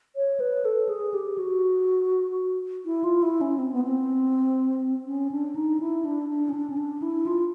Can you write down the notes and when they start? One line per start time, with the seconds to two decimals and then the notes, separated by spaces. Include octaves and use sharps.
0.16 C#5
0.40 B4
0.65 A4
0.89 G#4
1.14 G4
1.38 F#4
2.86 E4
3.04 F4
3.22 E4
3.41 C#4
3.58 C4
3.72 B3
3.85 C4
5.06 C#4
5.31 D4
5.56 D#4
5.80 E4
6.05 D4
6.29 D4
6.49 C#4
6.54 D4
6.70 C#4
6.77 D4
7.02 E4
7.26 F4